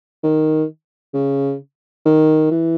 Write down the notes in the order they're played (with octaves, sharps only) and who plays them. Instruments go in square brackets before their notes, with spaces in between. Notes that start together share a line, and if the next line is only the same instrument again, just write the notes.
[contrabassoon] D#3
C#3
D#3
E3